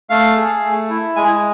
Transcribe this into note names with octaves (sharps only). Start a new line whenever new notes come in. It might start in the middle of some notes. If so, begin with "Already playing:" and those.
A3 F5
G#4
A3
E4
G#3 G#5